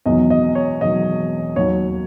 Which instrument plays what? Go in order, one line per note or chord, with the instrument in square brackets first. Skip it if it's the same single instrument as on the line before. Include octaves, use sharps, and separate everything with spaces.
[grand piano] E1 E2 D#3 F#3 D#5
D#5
C#5
E1 E2 D#3 F#3 D#5
D#2 D#3 F#3 C#5